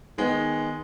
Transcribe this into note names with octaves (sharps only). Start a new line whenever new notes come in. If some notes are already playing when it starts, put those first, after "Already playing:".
D#3 G#3 B3